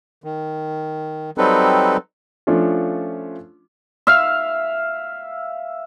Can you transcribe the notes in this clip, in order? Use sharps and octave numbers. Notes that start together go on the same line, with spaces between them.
D#3
F#3 G3 C4 D#4 A4 B4
F3 A3 C#4 D4 F4
E5 F5